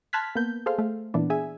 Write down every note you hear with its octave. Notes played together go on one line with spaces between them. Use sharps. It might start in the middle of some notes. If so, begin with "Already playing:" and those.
A5 C6 F6 F#6 G#6 B6
A#3 B3 G6
G#4 A4 C5 F5
A3
A#2 E3 B3 D4
G#4 E5 G#5